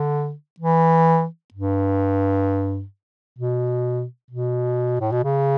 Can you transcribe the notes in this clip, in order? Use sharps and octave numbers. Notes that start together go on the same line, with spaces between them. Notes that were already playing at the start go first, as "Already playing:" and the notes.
Already playing: D3
E3
G2
B2
B2
A2
B2
C#3